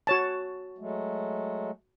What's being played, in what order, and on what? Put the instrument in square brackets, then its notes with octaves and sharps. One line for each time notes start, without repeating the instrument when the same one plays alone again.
[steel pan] F#4 C#5 A5
[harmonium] F#3 G#3 A3